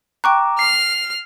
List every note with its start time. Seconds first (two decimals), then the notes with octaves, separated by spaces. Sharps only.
0.24 G5 A#5 C#6 D6 F#6
0.59 F6 C7